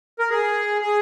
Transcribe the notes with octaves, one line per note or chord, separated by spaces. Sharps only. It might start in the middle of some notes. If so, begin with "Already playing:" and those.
A#4
G#4
G#4